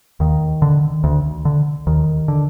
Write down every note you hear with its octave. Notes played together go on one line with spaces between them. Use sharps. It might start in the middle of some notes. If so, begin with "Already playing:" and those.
D#2 D#3
D3
D2
D3
D#2 D#3
D3